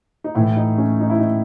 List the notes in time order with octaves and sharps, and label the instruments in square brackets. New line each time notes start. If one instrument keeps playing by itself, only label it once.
[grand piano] D#4
A2 E3 E4
D#4
C#4
D#4
E4
D#4